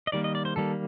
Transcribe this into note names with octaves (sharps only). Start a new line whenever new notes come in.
D#5
D#3 G3 A#3 D5
D#5
D5
C5
D#3 G3 A#3 A4